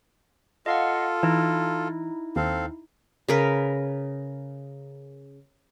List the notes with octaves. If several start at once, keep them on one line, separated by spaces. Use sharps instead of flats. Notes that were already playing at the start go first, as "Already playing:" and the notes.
F4 A4 D#5 F5 F#5
E3 D#4 E4
D#2 C4 A4 F5
C#3 A#4 B4